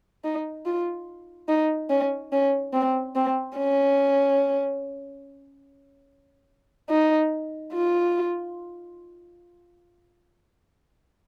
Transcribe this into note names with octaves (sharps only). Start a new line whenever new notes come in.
D#4
F4
D#4
C#4
C#4
C4
C4
C#4
D#4
F4